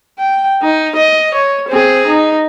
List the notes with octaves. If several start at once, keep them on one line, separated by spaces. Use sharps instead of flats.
G5
D#4
D#5
C#5
C4 G#4
D#4